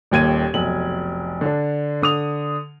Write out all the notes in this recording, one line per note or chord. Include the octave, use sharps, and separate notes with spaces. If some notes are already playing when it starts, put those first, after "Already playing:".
D#1 D#2 G#6 D#7
F1 B1 F#7
D3 D4
D3 D#6 F7